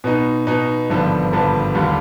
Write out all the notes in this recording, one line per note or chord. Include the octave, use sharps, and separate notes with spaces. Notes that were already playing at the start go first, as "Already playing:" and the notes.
B2 B3 D#4
B2 B3 D#4
G#1 G2 D3 F3 B3
G#1 G2 D3 F3 B3
D#2 D3 G3